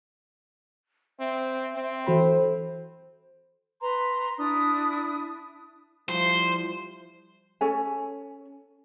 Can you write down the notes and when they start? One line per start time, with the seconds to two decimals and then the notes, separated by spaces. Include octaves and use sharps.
1.20 C4 E5
1.76 C4
2.07 E3 F#4 A4 C5 B5
3.81 B4 A#5 C6
4.38 D4 E4 D#6
6.09 F3 G3 E4 C5
7.61 C#4 A4 C#5 G#5